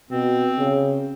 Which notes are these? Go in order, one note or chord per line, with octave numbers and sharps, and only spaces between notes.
B2 C4
C#3